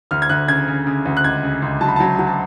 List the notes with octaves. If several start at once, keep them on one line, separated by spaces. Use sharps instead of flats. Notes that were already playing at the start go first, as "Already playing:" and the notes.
D2 F6
G#6
D2 F#6
C#3 G#6
C#3
C#3
D2
F#6
C#2 G#6
C#3
C#2
F#3 A5
B5
F#3 A5
F#3
A5